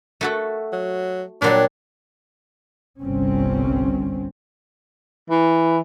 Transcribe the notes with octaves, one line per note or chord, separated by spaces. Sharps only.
A3 F#4 A4
F#3
A#2 F#3 G3 D4
G1 C2 G2 C4 C#4
E3